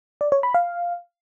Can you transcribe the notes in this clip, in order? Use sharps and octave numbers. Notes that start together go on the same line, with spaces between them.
D5
C#5
B5
F5